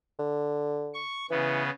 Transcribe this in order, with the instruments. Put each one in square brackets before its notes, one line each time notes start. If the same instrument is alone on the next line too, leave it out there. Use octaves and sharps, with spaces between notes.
[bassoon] D3
[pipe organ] C#6
[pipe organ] C#3 B3 [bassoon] E3